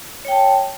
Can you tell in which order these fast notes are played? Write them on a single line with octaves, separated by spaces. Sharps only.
C#5 G5 A5